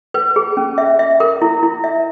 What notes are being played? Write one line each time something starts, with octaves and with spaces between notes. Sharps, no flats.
B4
G#4
C#4
E5
E5
A#4
E4
E4
E5